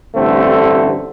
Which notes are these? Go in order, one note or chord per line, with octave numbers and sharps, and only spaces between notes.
A1 G2 D3 A3 C4